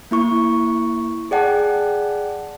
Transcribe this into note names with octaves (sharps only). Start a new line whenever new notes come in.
A#3 E4 C#6
G#4 D5 F#5 G5 A5